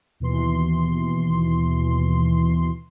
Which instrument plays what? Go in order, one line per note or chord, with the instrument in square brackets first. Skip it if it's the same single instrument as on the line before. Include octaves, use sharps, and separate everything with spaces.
[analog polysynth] D#2 B2 E3 C6